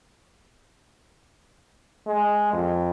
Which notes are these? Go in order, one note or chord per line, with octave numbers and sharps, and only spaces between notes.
G#3
F2